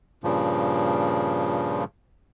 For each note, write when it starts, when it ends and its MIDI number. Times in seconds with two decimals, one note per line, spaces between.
0.24 1.84 43
0.24 1.84 46
0.24 1.84 49
0.24 1.84 53